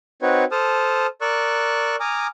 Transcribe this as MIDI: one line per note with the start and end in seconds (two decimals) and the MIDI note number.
0.22 0.44 60
0.22 0.44 63
0.22 0.44 66
0.22 0.44 71
0.22 0.44 73
0.52 1.07 69
0.52 1.07 72
0.52 1.07 81
0.52 1.07 87
0.52 1.07 89
1.21 1.96 70
1.21 1.96 74
1.21 1.96 85
1.21 1.96 88
1.21 1.96 90
2.00 2.27 80
2.00 2.27 82
2.00 2.27 86
2.00 2.27 87
2.00 2.27 89